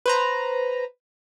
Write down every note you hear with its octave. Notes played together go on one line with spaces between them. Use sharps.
B4 C5 A#5